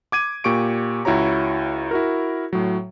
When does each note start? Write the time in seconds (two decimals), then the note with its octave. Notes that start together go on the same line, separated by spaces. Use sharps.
0.12 D6 G#6 D#7
0.44 A#2 G4 C#6 D7
1.05 C#2 E4 F#4 C#5 A#5
1.91 E4 F#4 A#4
2.53 A2 F#3